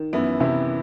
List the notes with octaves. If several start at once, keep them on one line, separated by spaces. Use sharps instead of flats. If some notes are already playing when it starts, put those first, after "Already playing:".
Already playing: D#3
F#2 E3 B3 E4
F#2 C3 E3 B3 E4